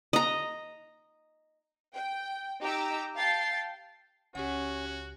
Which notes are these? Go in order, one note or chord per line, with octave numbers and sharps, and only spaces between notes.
D#5 A#5
G5
D#4 G4 G5 A#5 D6 E6
F5 G5 A5 A6 C7
C#2 C#4 F#4 G4 F#5